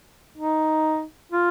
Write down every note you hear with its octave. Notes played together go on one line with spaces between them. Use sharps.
D#4
F4